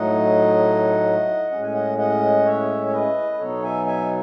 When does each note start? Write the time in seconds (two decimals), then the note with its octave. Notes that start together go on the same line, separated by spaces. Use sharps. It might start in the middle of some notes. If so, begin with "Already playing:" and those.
Already playing: A2 F#3 A3 D#4 D#5 F#5
1.51 A2 G#3 C#4 F#5
1.63 G#5
1.74 D#5 F#5
1.98 D#5 F#5
2.45 C#5 E5
2.86 C#5
2.92 B4 D#5
3.32 B4
3.39 B2 F#3 B3 D#4 A4 C#5
3.63 E5 G#5
3.86 E5 G#5